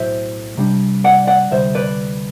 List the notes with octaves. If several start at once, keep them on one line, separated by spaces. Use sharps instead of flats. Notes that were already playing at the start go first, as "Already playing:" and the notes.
Already playing: B1 A2 F#3 C5 E5
C3 G3 D4
D5 F#5
D5 F#5
D2 C3 G3 C5 E5
B4 D5